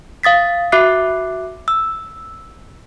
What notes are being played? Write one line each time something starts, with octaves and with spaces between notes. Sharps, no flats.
F5 D#6 A6 B6
F#4 E5 D6 F#6 C7
E6